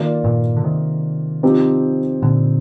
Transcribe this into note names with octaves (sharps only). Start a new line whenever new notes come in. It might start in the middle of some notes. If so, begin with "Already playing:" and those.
Already playing: D#3 A#3 F4 A#4 D5
G2 A#2
D3
C3 D#3
F3 C4 D#4 G4
A#2 D3